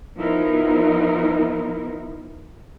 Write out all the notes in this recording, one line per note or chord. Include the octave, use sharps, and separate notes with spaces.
F3 B3 D#4 E4 A#4